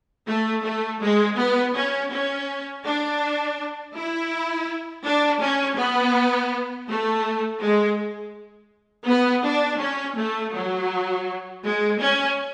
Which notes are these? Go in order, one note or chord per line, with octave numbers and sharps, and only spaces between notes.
A3
A3
G#3
B3
C#4
C#4
D4
E4
D4
C#4
B3
A3
G#3
B3
D4
C#4
A3
F#3
G#3
C#4